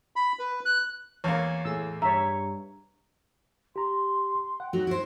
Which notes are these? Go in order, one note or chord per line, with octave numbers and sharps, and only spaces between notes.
B5
B4
F#6
E2 A#3 C#5
A2 G#4 E6
G2 C#5 E5 A#5
G4 A#5 C6
F#5 G5
F#3 A3 D#4 F#4
E4 C5